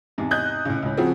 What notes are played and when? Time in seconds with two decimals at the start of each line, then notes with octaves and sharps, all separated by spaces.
0.18 E2 G#2 C3
0.31 D#5 F#6 G6
0.65 A2 C#3
0.83 C#2 A2
0.97 C#3 F3 C4 F4 F#4 G#4